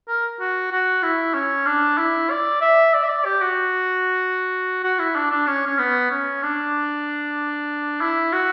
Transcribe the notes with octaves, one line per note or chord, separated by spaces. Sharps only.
A#4
F#4
F#4
E4
C#4
D4
E4
D5
E5
D5
E5
D5
G4
F#4
F#4
E4
D4
D4
C#4
C#4
B3
C#4
D4
E4
F#4